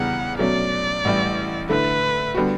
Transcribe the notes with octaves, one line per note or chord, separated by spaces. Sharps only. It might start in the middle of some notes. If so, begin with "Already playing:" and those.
Already playing: E2 C#3 G3 B3 F#5
B2 F#3 A3 C#4 D5
A1 A2 E3 G3
D3 A3 E4 B4
D3 G3 B3 F#4